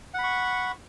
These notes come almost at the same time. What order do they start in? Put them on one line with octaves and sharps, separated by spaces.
F#5 B5 C#6